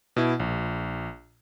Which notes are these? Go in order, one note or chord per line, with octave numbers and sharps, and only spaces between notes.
B2 E4
A#1